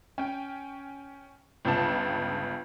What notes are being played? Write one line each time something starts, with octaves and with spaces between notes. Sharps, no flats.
C#4 G5
G1 C#2 C#3 A5